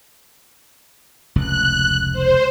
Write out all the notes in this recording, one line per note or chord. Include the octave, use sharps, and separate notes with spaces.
F1 C#2 F#6
C5